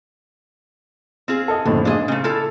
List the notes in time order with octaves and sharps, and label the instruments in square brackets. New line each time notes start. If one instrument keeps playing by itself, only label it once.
[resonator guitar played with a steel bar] C4 F4 G#4
[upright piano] A4 D#5
[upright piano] F#1 A2 F3 [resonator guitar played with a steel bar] D3
[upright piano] A#2 [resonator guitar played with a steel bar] D4 G#4 D#5
[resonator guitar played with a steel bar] C#3 A3
E4 F4 A4